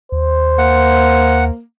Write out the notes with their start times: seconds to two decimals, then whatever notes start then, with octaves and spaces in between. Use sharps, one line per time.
0.12 D#2 C5
0.58 A#3 F#5